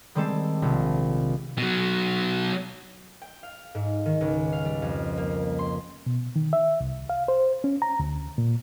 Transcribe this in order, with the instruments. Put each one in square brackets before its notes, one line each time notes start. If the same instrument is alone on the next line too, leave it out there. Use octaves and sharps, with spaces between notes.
[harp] D#3 G3 G#3 C4 A4
A#1 C3
[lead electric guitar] B2 F#3
[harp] G5
F5
G#2
D#3
C#2
F5
G3
F2
A#3
C6
[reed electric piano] B2
D#3
E5
C2
F5
C5
C#4
A#5
D2
A#2